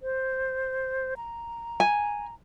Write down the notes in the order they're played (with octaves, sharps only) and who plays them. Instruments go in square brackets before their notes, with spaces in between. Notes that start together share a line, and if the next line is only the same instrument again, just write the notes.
[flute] C5
A#5
[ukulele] G#5